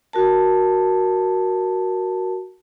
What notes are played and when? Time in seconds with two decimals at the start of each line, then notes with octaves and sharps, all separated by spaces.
0.13 F#4 A#4 A5